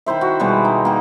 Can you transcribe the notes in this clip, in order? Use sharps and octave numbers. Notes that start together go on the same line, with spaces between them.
D#3 E4 C5 E5
F#4
B2 G3 G#3
D#4
A#3 G4